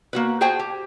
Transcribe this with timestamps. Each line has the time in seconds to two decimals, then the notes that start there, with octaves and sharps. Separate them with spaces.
0.13 A#3 F#4 B4
0.41 F#4 G#4 C5 G5 A5
0.59 G4